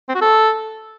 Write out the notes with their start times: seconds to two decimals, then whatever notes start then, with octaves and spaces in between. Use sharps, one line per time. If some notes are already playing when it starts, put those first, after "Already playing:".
0.09 C4
0.15 F#4
0.21 A4